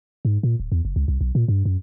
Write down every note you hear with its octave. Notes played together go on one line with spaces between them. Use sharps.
G#2
A#2
D1
E2
F#1
C#2
C2
B1
A#2
G2
F#2